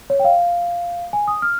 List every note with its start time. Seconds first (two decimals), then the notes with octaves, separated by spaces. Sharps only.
0.10 C#5
0.20 G5
0.24 F5
1.13 G#5
1.28 D#6
1.42 F6